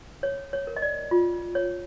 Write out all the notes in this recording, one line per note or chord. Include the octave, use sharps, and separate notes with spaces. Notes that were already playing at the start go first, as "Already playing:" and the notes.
C#5
C#5
A#4
D#5
D5
F4
C#5